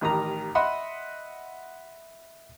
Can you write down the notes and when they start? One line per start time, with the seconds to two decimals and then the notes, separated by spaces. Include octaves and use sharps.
0.01 A1 D#3 G4 A#5
0.55 D#5 E5 F#5 B5 C6